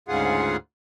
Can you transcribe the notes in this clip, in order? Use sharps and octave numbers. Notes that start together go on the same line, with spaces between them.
D2 G#2 C#3 F4 G#4 F#5